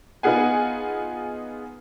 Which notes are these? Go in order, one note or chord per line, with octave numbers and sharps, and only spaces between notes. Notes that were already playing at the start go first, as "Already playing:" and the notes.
B3 D#4 F4 G#4 F#5 G#5